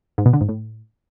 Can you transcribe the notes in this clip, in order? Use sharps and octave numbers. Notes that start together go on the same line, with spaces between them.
G#2
B2
D3
G#2
A2